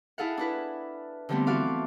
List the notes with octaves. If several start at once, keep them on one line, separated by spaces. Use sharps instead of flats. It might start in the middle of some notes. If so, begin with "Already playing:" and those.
E4 G#4 A4 F5 F#5
D4 E4 B4
D3 F3 G3 A3 B3 C4
E3 F#4 A4 F5 D6